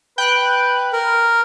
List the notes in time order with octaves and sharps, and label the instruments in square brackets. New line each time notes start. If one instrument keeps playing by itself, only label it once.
[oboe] B4 [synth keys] G5 F#6
[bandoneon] A#4